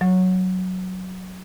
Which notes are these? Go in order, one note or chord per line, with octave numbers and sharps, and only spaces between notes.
F#3